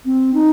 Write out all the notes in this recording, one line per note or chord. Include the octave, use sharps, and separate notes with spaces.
C4
D#4